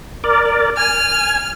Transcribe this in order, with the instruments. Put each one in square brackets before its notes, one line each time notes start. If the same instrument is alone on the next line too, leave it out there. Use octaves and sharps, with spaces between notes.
[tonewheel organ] A#4 D5
[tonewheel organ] G#5 [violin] F6